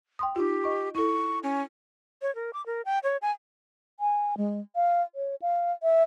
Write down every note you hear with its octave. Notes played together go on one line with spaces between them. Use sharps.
G5 C6 D#6
D#4 F4 G4
D#5 C#6
E4 A4 C#6
C#4
C#5
A#4
D6
A#4
G5
C#5
G#5
G#5
G#3
F5
C#5
F5
E5